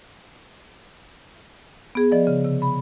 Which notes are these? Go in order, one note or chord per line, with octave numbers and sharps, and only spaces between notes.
B3 G#4
F3 D5 D#5
C#3
C3
B5